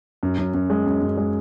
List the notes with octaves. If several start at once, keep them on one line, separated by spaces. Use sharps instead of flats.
F#2
F#2
F#2
G#3
F#2
F#2
G#3